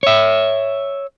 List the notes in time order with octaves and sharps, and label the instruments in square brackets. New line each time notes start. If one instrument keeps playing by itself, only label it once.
[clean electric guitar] C#5 E5